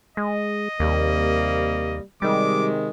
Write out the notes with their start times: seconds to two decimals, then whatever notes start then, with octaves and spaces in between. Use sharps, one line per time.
0.17 G#3 D#5
0.80 D#2 C3 G3 A#3
2.22 C3 D#3 G3 G#3 D6